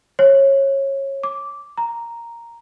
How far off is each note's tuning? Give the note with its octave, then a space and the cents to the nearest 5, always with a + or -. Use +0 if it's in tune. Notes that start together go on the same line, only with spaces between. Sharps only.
C#5 -20
D6 -10
A#5 +0